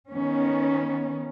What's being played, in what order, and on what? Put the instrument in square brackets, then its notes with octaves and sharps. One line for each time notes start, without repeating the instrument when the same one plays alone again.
[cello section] D#3 B3 C#4